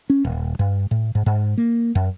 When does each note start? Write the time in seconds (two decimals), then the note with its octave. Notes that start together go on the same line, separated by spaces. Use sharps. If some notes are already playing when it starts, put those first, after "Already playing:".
0.10 C#4
0.25 D#1
0.59 G2
0.91 A2
1.15 G#2
1.26 G#2
1.57 A#3
1.95 F#2